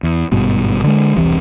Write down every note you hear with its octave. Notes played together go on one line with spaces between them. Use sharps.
E2
G#1 G2 B2
D3 G#3
E1 C2 C3 E3